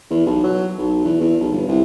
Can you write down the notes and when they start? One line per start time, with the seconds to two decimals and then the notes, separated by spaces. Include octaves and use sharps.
0.10 E2
0.26 B1
0.44 F#3
0.78 B1
1.04 E2
1.20 E2
1.41 B1
1.52 G1
1.68 C2